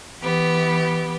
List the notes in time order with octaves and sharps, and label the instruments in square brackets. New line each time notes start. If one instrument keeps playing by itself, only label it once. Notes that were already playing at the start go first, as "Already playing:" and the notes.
[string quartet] E3 B3 G4